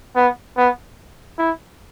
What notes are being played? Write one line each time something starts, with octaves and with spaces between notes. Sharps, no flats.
B3
B3
E4